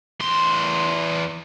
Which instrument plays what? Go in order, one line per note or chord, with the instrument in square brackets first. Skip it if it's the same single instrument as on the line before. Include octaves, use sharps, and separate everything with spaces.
[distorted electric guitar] E2 C6